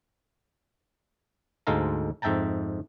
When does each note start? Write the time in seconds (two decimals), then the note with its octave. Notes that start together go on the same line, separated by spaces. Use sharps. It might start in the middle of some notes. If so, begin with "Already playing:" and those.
1.67 D2 G#2 G#3 A4 F5 A#5
2.22 F2 G#2 E5 G5 A5 A#5